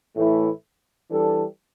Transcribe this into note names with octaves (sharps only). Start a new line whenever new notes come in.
A2 E3 A3 E4
E3 G3 D4 A4